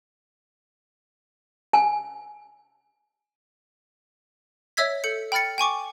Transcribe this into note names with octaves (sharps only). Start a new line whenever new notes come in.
G#5
C#5 D#5 E5 E6 G#6 B6
A4 G6 C#7
G5 B5 F6 A6 C#7
G5 G#5 C#6 D6